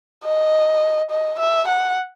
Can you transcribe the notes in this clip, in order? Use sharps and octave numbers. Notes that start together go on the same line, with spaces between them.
D#5
D#5
E5
F#5